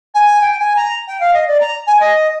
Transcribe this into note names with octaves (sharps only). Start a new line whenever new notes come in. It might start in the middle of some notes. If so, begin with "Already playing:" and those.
G#5
G5
G#5
A#5
G5
F5
D#5
D5
A#5
G#5
D#5